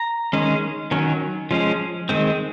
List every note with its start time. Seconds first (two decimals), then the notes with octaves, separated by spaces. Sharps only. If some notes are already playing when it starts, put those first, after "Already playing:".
Already playing: A#5
0.33 D#3 G#3 C#4
0.91 D#3 F#3 C#4
1.51 F3 G#3 C#4
2.09 D#3 G#3 C4